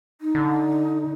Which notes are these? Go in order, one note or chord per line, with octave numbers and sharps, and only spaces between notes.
D#4
D3